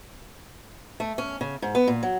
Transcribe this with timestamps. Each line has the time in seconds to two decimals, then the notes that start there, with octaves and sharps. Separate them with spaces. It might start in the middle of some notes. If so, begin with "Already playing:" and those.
1.00 A3
1.18 C#4
1.41 C#3
1.62 G#2
1.75 B3
1.88 A#2
2.03 F#3